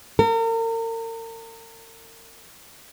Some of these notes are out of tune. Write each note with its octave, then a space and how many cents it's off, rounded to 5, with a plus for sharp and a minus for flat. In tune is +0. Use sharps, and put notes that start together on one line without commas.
A#4 -40